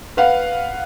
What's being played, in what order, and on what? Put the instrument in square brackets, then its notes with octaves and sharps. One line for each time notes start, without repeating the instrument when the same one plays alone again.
[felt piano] B4 F5 F#5